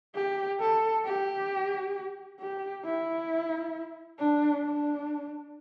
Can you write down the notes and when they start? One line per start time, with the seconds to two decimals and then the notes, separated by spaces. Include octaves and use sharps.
0.15 G4
0.60 A4
1.05 G4
2.40 G4
2.85 E4
4.19 D4
4.64 D4